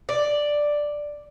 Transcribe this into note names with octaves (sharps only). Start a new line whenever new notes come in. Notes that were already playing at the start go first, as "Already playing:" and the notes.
D5